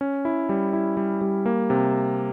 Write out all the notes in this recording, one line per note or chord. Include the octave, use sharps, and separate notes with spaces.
C#4
E4
G3
E4
G3
G3
A#3
C3